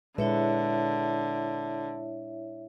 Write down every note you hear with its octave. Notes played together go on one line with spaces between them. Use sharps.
A#2 D3 G#3 E4 B4 C#5 E5